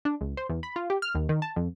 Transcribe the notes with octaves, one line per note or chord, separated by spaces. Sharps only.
D4
C#2
C5
E2
B5
F4
G4
F6
D#2
D#3
A5
F2